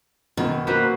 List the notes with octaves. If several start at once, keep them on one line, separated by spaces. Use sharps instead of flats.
F#2 B2 D#3
F#3 A#3 B4 C5